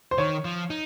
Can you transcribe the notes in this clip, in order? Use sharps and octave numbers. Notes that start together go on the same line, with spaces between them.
C5
D#3 C#5
F3
D#4